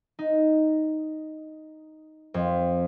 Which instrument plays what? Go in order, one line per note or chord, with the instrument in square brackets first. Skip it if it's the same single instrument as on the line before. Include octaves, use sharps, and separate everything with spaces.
[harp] D#4
F2